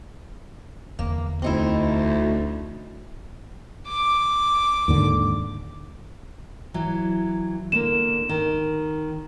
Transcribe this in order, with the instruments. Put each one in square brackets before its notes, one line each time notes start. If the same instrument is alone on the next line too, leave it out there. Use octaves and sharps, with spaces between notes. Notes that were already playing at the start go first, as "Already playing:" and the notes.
[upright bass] E2 D3 [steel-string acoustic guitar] A#3
[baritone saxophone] D2 [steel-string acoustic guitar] C4 D#4 E4
[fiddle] D6
[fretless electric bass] D#2 G#2 D3
[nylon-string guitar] E3 F#3
[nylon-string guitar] D3 A#3 [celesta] E7
[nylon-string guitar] D#3